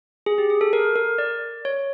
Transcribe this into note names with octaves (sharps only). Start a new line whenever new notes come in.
G#4
G4
G#4
A4
A#4
A#4
D5
C#5